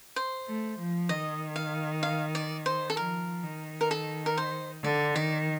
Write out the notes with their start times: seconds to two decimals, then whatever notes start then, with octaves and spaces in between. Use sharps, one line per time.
0.16 C5
0.47 A3
0.78 F3
1.09 D#3 D#5
1.56 F5
2.03 F5
2.35 D5
2.66 C5
2.90 A4
2.97 F3 A#4
3.44 D#3
3.81 A#4
3.91 A4
4.26 A#4
4.37 C5
4.84 D3 D5
5.15 D#3 D5